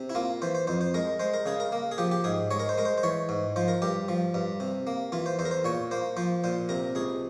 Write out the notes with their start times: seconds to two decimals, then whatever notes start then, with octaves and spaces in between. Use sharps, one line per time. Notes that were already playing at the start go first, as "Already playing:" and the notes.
Already playing: C3
0.10 E4
0.15 A#3 F4
0.42 E3 C5
0.55 C5
0.67 F2 C5
0.81 C5
0.94 G#3 A#4
1.19 G#3 C5
1.34 A#4
1.46 C#3 G#4
1.60 A#4
1.72 A#3
1.92 G#4
1.98 F3 G4
2.11 G4
2.24 G#2 G#4
2.51 G#3 C#5
2.60 A#4
2.69 C5
2.78 G#3 A#4
2.85 C5
2.98 C5
3.03 E3 C#5
3.29 G#2
3.56 F3 C5
3.68 A#4
3.82 G2 G4
4.08 F3
4.34 G2
4.60 C3
4.87 A#3
5.12 E3 F4
5.26 C5
5.39 E2 C5
5.45 A#4
5.51 C5
5.65 A#2 C#5
5.91 A#3 C5
6.17 F3 C5
6.44 A#2 C5
6.69 C3 A#4
6.95 C#2 G#4